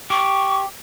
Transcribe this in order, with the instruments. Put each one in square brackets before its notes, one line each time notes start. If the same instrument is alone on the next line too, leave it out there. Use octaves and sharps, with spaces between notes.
[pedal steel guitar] G4 [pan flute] C#6